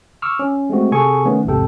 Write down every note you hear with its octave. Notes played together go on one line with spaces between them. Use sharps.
C#6 D6 E6 F6
C#4
G#3 A3 C4 F#4
C3 G#4 A4 G#5 C#6
D#3 A3 B3 C#4
A#1 D#2 G#2 C3 A4 G5